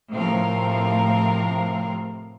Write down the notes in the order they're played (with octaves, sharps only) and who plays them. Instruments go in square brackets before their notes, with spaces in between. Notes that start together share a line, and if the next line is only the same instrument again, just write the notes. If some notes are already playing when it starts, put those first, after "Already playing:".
[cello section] A2 C3 F3 C4 A#4 F5